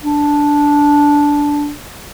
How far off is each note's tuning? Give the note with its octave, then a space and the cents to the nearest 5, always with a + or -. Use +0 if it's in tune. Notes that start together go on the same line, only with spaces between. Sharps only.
D4 -10